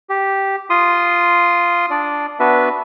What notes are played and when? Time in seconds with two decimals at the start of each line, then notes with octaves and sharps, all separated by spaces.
0.09 G4
0.70 F4 C6 D#6
1.91 D4 D5
2.40 B3 D4 F#4 B4 E5